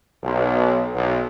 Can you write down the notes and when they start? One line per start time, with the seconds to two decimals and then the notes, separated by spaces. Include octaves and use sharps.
0.23 B1
0.95 B1